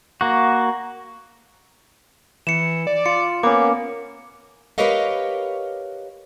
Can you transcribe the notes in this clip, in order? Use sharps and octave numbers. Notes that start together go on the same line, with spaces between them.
A#3 F#4
E3 C#7 E7
D5
F4 C#7
A#3 B3 C#4 D6
G4 A#4 B4 C#5 D#5 F5